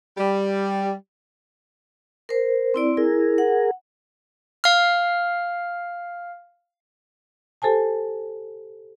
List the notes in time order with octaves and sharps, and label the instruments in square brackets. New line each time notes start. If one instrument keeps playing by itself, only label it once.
[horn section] G3
[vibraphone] A#4 C5
C4 E4 D5
[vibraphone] E4 [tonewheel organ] G#4 A#4
[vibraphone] F#5
[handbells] F5 F6
[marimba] G4 A4 C5 G#5 A5